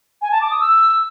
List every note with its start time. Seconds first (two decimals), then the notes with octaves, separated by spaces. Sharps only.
0.22 G#5
0.31 A5
0.41 D6
0.51 D#6
0.60 E6